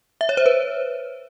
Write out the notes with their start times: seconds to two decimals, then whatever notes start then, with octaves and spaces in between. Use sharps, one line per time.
0.21 E5
0.29 C#5
0.37 C5
0.46 B4